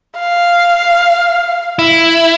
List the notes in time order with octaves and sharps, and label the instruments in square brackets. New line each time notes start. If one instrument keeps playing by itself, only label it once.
[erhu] F5
[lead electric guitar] E4